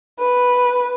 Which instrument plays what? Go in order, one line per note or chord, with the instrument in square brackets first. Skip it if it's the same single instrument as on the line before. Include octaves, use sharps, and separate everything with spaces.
[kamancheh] B4